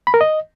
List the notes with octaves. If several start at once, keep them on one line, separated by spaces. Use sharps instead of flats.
B5
A#4
D#5